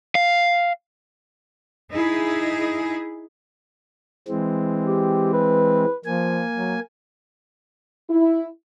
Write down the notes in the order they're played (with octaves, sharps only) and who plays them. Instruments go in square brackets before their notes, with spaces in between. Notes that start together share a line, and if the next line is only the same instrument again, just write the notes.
[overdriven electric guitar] F5
[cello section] D#4 E4 G#4
[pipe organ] E3 G#3 C4
[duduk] G4
B4
[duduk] F3 [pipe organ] A#3 G#5
[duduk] F#3
[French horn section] E4